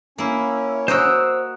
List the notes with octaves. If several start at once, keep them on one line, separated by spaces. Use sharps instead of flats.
A#3 C#4 E4
F#4 A#4 C5 D#5 E6